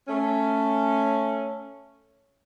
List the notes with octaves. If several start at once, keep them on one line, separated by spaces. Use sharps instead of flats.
A3 C#4